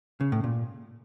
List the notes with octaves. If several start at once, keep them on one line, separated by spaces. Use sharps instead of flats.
C#3
A2
A#2